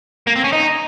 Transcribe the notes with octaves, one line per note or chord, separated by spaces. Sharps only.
A#3
C4
C#4
D#4